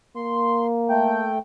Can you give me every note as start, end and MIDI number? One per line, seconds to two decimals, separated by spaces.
0.16 1.35 58
0.16 0.67 84
0.90 1.38 57
0.90 1.38 79